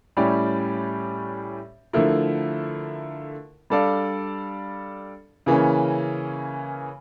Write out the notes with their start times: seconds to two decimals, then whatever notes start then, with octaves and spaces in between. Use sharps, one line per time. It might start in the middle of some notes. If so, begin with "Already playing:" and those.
0.17 A2 G3 C#4 G4 D5
1.93 D3 F3 A3 E4 A#4
3.70 G3 D4 A4 D5 F5
5.46 C#3 E3 A#3 C#4